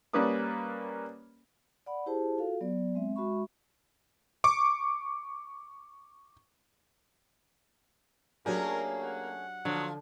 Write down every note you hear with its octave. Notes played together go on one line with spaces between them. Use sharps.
G3 A#3 C#4 B4 D5 D#6
D5 F#5 B5
E4 G4 G#4 C5 A5
F4 F#4 A4 F5
F#3 B3 D5
G#3 C4 E5
G#3 F#4 E5 B5 C#6
C#6 D6
F#3 A3 A#3 C#4 D4 G4 G#4 A#4
F#5
D3 F3 F#3